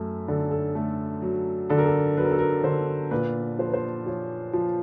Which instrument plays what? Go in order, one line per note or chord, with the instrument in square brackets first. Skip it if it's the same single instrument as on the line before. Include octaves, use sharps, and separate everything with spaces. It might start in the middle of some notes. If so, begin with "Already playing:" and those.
Already playing: [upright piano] F#2 A3
D3 A4
A4
A3
F#3
D3 A4
A#4
A4
F#3 B4
A#4
A4
A#4
D3 C5
A#2 B4
F3 C5
B4
C5
F3 C#5
F3